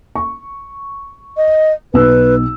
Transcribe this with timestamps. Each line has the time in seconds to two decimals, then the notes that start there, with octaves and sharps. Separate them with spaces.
0.15 C#6
1.37 D#5
1.94 B1 D#4 B4 E6